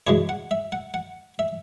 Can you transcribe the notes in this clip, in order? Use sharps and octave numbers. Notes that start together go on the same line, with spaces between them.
F#2 C#3 E3 G#3 C#5
F#5
E5
F#5
F#5
E5